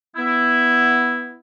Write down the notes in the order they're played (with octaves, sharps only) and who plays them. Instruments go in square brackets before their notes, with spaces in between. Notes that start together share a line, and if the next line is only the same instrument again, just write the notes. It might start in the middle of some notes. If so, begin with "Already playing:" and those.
[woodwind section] B3 E4